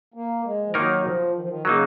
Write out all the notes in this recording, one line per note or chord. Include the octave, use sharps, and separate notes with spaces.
A#3
G#3
F3
D#3 F#3 A#3 D#4 A#4
F3
D#3
F3
D#3
C#3 F#3 A#3 D#4